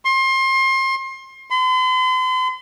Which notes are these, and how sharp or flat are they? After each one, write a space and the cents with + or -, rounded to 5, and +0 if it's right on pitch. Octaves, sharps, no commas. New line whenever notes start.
C6 +30
C6 -45